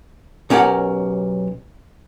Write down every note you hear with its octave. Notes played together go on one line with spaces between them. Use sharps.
B1 C#4 G4 A#4 F#5